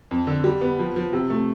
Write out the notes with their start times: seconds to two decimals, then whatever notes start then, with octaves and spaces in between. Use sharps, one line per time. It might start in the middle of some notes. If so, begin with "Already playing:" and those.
0.11 F2
0.27 D3
0.44 G3
0.61 B3
0.79 F3
0.96 F3
1.13 C3
1.30 A3